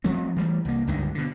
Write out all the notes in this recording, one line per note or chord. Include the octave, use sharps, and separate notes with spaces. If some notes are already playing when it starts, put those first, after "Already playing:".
F3 F#3 A3 C4
E3 G3 A3
C2 A#3
C#2 G2 D3 D#3
B2 D3